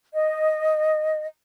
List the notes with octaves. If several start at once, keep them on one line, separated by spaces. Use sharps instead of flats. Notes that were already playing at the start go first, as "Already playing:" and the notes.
D#5